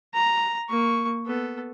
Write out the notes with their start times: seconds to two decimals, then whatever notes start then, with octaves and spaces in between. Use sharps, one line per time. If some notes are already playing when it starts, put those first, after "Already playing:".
0.14 A#5
0.69 A#3 C#6
1.26 B3 A4